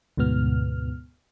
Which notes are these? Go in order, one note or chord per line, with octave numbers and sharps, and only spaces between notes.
D2 G#2 B2 B3 F6